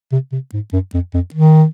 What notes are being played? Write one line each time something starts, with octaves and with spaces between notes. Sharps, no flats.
C3
C3
G#2
F#2
F2
F2
D#3